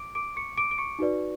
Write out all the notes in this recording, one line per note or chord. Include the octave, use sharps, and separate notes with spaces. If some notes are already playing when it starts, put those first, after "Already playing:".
Already playing: D6 D7
D6 D7
C#6 C#7
D6 D7
D7
C#6 C#7
D#4 F#4 B4 D5